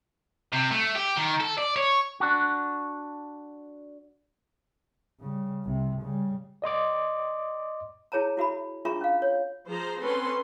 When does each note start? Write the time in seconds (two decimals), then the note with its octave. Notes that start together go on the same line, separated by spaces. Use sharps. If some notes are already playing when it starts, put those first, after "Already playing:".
0.53 C3
0.71 A3
0.95 G4
1.17 D#3
1.41 A4
1.58 D5
1.76 C#5
2.20 D4 F#4
5.20 C#3 G3
5.64 C2 C3
6.02 C#3 G3
6.62 D5 D#5 C6 D6
8.12 E4 G#4 C#5 A5 A#5
8.37 E4 F#4 E5 B5
8.85 D4 F4 G#4 E5 A#5 C#6
9.01 C#4 F5
9.22 C#5
9.67 F3 G#4 C5 A#5
10.00 C4 C#4 A4 B4 C6